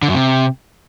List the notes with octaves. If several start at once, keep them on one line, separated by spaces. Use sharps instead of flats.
D3
F#2
C3